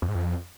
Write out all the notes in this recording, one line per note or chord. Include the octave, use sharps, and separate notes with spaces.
F2
G#2
F2